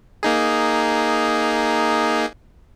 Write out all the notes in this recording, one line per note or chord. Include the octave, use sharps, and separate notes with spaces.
A#3 D#4 G#4